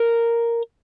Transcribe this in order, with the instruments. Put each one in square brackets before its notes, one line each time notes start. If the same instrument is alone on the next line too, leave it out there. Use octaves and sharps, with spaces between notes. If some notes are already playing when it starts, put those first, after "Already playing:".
Already playing: [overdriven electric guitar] A#4